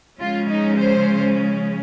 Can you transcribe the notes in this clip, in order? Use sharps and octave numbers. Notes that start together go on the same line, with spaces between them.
C#3 F3 G#3 C#4 F4
D#4
C5